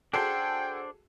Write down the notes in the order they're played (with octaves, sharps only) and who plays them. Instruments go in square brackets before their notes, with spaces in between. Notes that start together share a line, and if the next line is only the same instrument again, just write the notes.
[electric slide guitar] D4 C5 [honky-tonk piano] F#4 G#4 A4 [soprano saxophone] G5